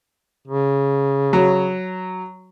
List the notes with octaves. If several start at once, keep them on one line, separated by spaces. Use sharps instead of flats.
C#3
F#3